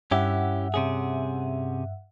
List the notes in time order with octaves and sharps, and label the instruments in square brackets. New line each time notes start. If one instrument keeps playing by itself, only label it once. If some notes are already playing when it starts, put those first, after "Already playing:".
[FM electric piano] G2 E5 F#5 [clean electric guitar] C#4 E4 G4
[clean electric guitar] C3 C#4 G#4